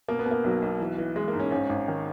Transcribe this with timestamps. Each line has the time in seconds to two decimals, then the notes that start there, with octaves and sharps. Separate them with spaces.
0.08 B2 A#3
0.19 B3
0.26 B2
0.31 A#3
0.44 B1 F#3
0.62 B1
0.80 E3
0.98 E3
1.16 E3 G#3
1.28 A#3
1.33 G#2
1.39 C#4
1.51 G#1 C#4
1.69 G#1
1.88 D#3